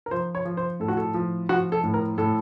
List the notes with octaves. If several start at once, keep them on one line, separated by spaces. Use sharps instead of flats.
A#4
F3 C5
C#5
F3
C5
A2 A4
F#4
A4
F3
F3 F#4
A4
A2
A#4
A2 A4